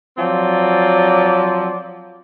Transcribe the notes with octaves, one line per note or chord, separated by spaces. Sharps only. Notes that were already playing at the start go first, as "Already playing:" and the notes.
F3 F#3 C4 D5